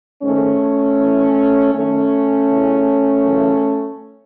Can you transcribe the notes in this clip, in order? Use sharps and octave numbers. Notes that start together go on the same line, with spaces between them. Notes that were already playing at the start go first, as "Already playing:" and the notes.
G#2 D#3 A3 C#4
A2 E3
F#2 D#3 A3 C#4
E2 C#3 E3
F#2 C#3 E3